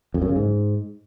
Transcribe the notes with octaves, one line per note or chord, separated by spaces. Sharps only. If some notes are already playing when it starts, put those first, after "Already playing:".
F2
F#2
C#3
G#2